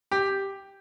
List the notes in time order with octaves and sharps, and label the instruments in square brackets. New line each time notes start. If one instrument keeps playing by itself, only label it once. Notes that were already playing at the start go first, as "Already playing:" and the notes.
[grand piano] G4